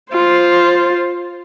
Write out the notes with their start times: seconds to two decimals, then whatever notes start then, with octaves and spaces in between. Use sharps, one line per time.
0.13 F4 C5